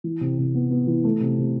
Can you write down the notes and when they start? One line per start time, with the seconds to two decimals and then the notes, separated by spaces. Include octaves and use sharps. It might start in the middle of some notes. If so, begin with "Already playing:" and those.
0.04 E3
0.21 C3
0.38 C3
0.55 B3
0.71 B3
0.87 E3
1.04 A3
1.21 C3
1.38 C3